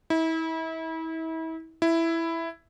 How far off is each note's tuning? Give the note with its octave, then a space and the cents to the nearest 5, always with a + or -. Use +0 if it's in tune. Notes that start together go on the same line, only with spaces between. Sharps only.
E4 -35
E4 +5